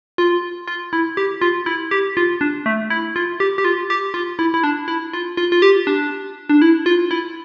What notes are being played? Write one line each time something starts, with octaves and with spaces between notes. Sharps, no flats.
F4
F4
E4
G4
F4
E4
G4
F4
D4
A3
E4
F4
G4
G4
F4
G4
F4
E4
E4
D4
E4
F4
F4
F4
G4
D4
D4
E4
F4
E4